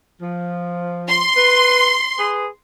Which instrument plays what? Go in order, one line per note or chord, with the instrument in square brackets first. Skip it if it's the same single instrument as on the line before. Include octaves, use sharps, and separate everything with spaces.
[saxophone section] F3
[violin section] C6
[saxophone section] B4
G#4 B4